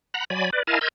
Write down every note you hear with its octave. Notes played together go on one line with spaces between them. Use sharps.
F#5 A#5 B5
F#3 D5 G#5 B5
B4 D5
E4 A#4 D#5 F5 G#5 A5
A#4 D#5 C6 E6 G6 G#6